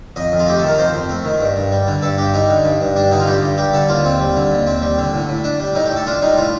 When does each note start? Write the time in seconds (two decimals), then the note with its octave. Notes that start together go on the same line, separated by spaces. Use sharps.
0.16 F2 D#5
0.32 F2
0.40 F4
0.47 A3 G4
0.59 D#3 A4
0.69 A#4
0.79 F2 C5
0.94 F2
1.09 A3
1.25 D#3
1.41 G2
1.56 G2
1.72 G3
1.87 D3
2.02 G2 A4
2.18 G2 G4
2.34 G3 D#4
2.49 D3
2.65 G2
2.80 G2
2.96 G3 D4
3.11 D3 D#4
3.20 F4
3.27 G2 G4
3.42 G2
3.58 G3 G4
3.73 D3 A4
3.89 D#2 F4
4.05 C4
4.20 G3
4.36 D3
4.52 D#2
4.67 C4
4.82 G3
4.98 D3
5.13 A2
5.29 A2
5.44 D4
5.60 G3
5.75 A2 D#4
5.86 G4
5.91 A2
5.96 A4
6.07 D4 F4
6.22 G3 D#4
6.37 A2 F4